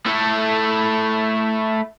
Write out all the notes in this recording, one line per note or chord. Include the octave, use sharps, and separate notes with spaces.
A3 E4